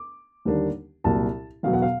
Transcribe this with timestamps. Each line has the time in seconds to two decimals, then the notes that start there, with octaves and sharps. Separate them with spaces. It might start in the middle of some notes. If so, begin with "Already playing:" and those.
Already playing: D6
0.45 D#2 D3 G3 A#3 D4
1.04 C2 A#2 F#3 A5
1.63 E2 B2 F#3 F5
1.73 F#5
1.82 F5